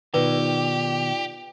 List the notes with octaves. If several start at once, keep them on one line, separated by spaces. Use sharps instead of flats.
B2 D#3 D#4 F4 G4 B4 D5